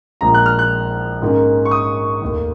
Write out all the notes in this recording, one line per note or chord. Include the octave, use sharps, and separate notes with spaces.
A#1 A#2 F3 G#3 A#5
F#6
F6
F#6
G#2 D#3 A#3 C#4
C#6
D#6
F1 D#2 D#3